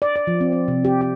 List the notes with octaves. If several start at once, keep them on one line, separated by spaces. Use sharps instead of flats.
D5
D5
F3
C4
C4
C3
G4
G4